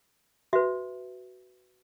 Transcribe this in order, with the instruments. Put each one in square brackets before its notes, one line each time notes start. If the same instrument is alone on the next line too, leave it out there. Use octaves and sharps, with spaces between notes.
[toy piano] F#4 B4 E5